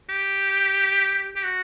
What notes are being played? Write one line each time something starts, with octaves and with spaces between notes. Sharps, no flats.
G4
G4
F#4